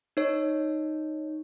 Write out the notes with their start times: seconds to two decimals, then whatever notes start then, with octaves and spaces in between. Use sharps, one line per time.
0.17 D#4 C#5